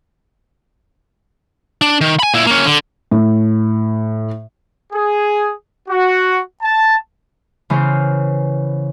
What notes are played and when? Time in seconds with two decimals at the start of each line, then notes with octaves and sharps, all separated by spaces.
1.82 D4
2.01 D#3
2.19 G#5 B5
2.34 A#2 E4
2.47 A#3 C#4
2.66 D3
3.11 A2
4.93 G#4
5.89 F#4
6.62 A5
7.70 C#3 E3 B3 C5 F6